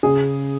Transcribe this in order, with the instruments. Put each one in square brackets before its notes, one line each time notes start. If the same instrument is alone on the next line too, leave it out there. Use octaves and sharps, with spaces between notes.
[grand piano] C#3 [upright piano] G#4